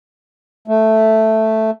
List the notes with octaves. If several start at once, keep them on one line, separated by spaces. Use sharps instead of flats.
A3